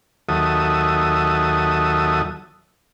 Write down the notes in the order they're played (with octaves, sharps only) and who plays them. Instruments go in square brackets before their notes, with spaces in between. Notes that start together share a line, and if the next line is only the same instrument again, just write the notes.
[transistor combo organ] D#2 F#3 A4 E5 D#6